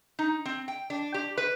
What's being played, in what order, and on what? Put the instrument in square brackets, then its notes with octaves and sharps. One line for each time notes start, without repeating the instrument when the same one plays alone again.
[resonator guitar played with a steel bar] D#4
C4
G5
D4
G4
B4